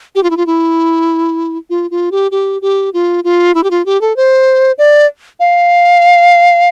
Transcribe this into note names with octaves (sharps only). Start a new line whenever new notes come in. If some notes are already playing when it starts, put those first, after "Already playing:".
G4
F4
E4
F4
E4
F4
F4
G4
G4
G4
F4
F4
E4
G4
F4
G4
A4
C5
D5
F5